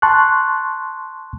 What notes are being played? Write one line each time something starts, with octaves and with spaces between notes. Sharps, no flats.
A5 C6 C#6 F#6